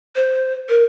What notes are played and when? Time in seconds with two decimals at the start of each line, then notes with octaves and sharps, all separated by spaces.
0.16 C5
0.69 A#4